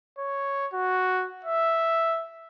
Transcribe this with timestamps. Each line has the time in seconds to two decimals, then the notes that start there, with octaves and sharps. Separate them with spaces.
0.18 C#5
0.73 F#4
1.45 E5